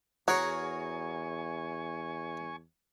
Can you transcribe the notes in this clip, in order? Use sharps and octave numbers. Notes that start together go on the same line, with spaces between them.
E2 F#4 G#4 A#4 C#5 G#5 C#6